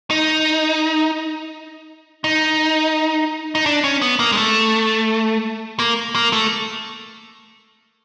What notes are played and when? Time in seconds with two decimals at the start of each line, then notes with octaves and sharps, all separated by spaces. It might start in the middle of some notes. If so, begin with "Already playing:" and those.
0.10 D#4
2.24 D#4
3.55 D#4
3.66 D4
3.84 C#4
4.02 B3
4.19 A#3
4.32 G#3
4.37 A3
5.80 A#3
6.15 A#3
6.33 A3